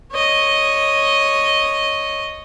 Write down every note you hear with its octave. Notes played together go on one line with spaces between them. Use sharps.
C#5 D#5